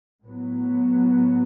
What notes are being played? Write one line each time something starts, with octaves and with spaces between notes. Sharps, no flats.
A2 F#3 B3